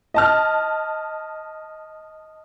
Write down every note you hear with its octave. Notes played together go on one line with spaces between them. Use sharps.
D#5 A5 F6